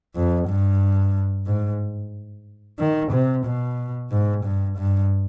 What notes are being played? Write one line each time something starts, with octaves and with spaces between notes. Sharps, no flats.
F2
G2
G#2
D#3
C3
B2
G#2
G2
G2